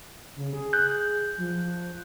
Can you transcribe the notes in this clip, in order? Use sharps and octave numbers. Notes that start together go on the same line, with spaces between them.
C#3
G#4
F#6 G6
F3